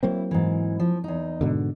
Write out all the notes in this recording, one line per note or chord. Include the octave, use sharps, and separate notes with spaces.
F#3 A#3 C4 E4
G#2 E3
F3
E2 D#4
G#2 B2 D3